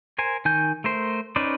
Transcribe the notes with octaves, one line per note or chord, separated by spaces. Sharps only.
A#4 C5 G#5
D#3 G#5 G6
A3 A#4 C5
C#4 D#4 B4 C5 D5